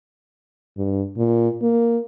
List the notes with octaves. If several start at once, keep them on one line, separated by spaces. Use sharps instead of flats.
G2
A#2
A#3